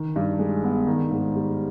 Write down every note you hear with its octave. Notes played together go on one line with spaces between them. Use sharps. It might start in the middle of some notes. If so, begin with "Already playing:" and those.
Already playing: D#3
G2
G#3
B3
D#3
G#2
G3